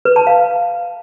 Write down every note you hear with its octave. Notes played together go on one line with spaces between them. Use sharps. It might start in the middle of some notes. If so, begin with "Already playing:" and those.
B4
A5
F5